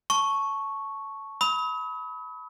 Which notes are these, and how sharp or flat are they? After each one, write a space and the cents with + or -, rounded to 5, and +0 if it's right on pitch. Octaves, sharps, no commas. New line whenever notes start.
A5 +0 C#6 +0
B5 +0 D#6 +45